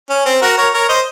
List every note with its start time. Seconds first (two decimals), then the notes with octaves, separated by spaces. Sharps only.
0.10 C#4
0.26 C4
0.42 F#4 A#4
0.58 A#4 C#5
0.74 A#4 C#5
0.89 C5 D#5